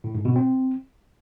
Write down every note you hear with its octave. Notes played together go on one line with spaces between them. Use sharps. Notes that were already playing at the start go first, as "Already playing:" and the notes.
A2
G#2
B2
C4